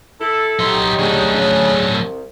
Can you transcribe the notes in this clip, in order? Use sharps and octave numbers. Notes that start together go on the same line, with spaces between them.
E4 A4
D#3 F#3 D#4 G4 C6
F#3 A3 C#4 D4 G#4
D2 C#3
C2